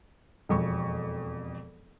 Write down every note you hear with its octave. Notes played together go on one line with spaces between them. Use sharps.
E1 F2 C#6